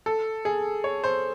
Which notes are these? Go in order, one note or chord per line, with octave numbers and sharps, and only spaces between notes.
A4
G#4
C#5
C5